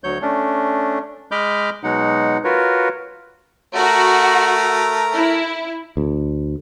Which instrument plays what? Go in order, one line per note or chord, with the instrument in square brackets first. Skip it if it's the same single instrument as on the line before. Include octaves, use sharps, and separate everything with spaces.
[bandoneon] D2 F#3 C#5 G6
A3 C#4 D4
G#3 D#5 B5 D6 F6 G6
B2 F#3 G#3 D#4 F#5
F4 F#4 A#4 B4 C#5
[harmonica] A3 A#4 [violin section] F#4
[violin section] E4
[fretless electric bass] D2